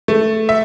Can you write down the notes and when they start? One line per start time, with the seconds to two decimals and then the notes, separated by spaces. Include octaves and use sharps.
0.08 A3
0.49 E5